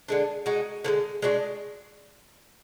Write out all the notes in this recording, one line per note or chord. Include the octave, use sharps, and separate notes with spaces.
D3 G#3 D4
G#3 D#4 F#4
D3 F3 G#3
G#3 D4 F#4